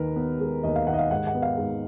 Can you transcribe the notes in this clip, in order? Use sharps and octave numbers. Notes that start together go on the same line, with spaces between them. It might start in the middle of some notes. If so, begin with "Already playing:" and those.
Already playing: D#2 D#3 A#4 B4
B3
G#3
D#2 D#5
F5
D#3 F#5
D#5
F5
G#2 F#5
F#5
B3
F5
G#2